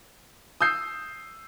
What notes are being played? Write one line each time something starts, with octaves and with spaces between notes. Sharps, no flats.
D#6 E6 G6 C7